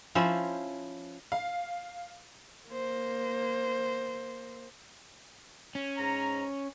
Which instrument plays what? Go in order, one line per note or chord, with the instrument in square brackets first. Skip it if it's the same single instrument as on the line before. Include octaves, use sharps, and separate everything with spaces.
[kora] F3 C#4 E4 C5
[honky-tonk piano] F5
[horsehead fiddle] A#3 C5
[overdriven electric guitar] C#4
[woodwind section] G#2 A#5